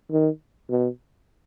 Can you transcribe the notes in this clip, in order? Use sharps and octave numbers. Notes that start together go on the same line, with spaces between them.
D#3
B2